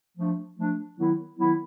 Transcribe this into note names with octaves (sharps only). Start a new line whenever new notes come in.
F3 A3 D4
F3 A3 D4
D#3 F#3 B3 E4
D#3 F#3 B3 E4